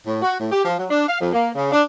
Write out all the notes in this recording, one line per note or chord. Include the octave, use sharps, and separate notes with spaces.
A2
F#4
A2
G4
F3
F#3
D4
F5
F2
A#3
C#3
D4